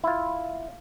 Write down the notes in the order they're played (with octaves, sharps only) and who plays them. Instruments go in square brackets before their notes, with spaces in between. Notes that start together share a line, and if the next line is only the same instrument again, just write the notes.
[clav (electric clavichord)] E4 F4